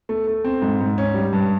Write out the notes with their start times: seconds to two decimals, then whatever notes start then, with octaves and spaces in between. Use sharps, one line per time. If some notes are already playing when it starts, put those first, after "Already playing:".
0.09 A3
0.27 A3
0.45 C4
0.62 G#2
0.80 G#2
0.98 C#4
1.14 G3
1.33 G2